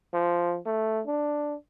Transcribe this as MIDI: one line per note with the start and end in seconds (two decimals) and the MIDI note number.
0.14 0.58 53
0.66 1.02 57
1.07 1.55 62